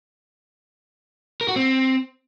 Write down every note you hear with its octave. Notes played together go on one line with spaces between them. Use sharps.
A#4
F#4
C4